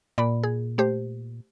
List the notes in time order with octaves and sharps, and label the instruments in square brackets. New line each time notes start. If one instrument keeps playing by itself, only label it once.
[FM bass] A#2 [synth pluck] D5 B5
[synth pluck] G#4
A3 G4 C5